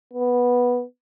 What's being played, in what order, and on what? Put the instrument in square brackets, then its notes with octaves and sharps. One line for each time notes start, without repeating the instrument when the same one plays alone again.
[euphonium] B3